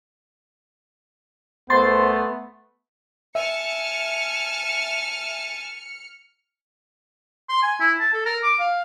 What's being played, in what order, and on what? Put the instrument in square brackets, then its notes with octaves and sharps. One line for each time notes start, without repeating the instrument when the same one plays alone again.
[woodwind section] C2 C5 [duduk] A3 [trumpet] B3 [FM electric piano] C6 A6
[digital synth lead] E5 [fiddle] G#5 A5 [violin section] F6 C#7
[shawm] C6
G#5
E4
A5
A4
A#4
D6
F5